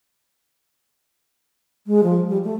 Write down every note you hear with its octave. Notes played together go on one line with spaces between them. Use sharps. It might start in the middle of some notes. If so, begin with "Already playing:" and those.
G#3
F3
G3
A3